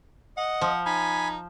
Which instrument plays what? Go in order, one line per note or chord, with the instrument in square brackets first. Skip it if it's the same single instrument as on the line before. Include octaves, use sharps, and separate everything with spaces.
[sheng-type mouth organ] D#5 [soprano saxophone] F#5
[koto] F3
[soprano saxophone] D#4 [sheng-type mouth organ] G#5 B5